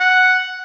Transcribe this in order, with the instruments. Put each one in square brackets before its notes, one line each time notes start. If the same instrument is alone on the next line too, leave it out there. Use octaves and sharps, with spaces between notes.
[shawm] F#5